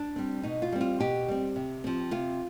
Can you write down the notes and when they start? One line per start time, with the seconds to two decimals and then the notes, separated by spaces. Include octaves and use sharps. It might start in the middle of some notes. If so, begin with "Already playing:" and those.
Already playing: D4
0.16 G3 C4
0.43 B2 D#4
0.62 F4
0.72 G3 C4
0.81 F4
1.00 B2 G4
1.28 G3 C4
1.56 C3
1.84 F3 C4
2.11 C3 F4